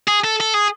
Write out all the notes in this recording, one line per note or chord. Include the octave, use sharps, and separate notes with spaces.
G#4
A4
A4
G#4